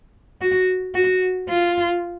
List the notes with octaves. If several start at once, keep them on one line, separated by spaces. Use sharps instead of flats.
F#4
F#4
F4